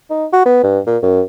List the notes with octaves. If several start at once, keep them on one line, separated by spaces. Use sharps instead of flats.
D#4
F#4
B3
G2
A#2
F#2